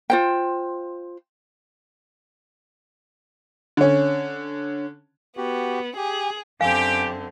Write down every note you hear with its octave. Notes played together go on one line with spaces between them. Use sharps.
F4 C5 G5
D3 C#4
B3 F#4 G4
G4 G#4
F#2 D3 C4 G4 F5 G#5